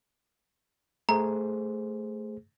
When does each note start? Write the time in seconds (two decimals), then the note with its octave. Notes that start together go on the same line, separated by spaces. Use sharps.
1.09 A3 G#4 C5 A#5